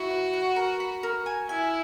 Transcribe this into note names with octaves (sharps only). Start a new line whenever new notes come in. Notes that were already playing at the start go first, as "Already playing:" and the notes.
Already playing: E4 F#4
B4
F#5
A#4
B5
A#4
G#5
E4 G#5